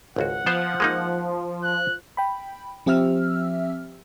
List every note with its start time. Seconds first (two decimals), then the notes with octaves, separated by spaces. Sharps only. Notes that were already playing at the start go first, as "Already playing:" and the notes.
0.16 G#1 C#2 F#4 F#5
0.46 F3 B3 C5
0.80 G#3 A#3 D#4
1.64 F#6
2.17 G5 B5
2.86 F3 C4 G4 E5 E6 F6